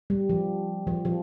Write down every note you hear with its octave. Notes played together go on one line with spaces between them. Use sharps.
G3
F3
F3
F3